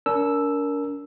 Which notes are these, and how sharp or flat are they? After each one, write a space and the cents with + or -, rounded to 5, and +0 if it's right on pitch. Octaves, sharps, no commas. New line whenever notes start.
D4 -45 A#4 +0 E6 +0